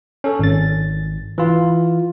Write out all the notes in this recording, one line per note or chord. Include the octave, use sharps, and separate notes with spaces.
C#4 A4
G#1 A6
E3 F4